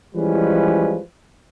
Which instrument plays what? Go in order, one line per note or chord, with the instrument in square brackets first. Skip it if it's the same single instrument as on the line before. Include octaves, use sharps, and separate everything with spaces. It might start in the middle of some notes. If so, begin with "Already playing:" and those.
[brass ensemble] E3 F3 G3 G#3 C#4 B4